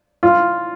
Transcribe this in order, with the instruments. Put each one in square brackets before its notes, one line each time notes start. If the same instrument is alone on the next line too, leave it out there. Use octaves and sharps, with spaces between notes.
[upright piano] F4